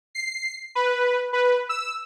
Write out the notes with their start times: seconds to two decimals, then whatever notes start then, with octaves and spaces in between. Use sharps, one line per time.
0.15 C7
0.75 B4
1.33 B4
1.69 E6